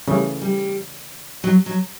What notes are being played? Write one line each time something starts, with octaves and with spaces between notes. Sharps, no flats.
C#3 E3 G3 A3 C#4
G3
F#3
F#3